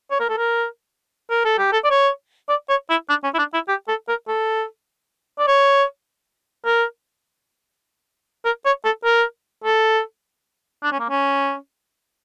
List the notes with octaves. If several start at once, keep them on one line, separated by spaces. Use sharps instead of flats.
C#5
A#4
A4
A#4
A#4
A4
G4
A4
D5
C#5
D5
C#5
E4
D4
C#4
E4
D4
E4
G4
A4
A#4
A4
D5
C#5
A#4
A#4
C#5
A4
A#4
A4
D4
C#4
A#3
C#4